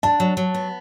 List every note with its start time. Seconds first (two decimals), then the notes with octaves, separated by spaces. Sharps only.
0.03 D4 A5
0.20 F#3
0.37 F#3
0.54 B3